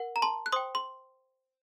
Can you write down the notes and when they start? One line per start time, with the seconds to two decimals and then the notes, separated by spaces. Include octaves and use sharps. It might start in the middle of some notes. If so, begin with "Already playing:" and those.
Already playing: A#4 F#5
0.16 A#5
0.22 A5 C6
0.46 F#6
0.52 C5 G5 C6 D#6
0.75 C6